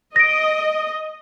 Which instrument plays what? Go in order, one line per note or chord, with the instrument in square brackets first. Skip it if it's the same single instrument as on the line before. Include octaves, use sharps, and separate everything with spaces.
[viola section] D#5 [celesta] A#6 D7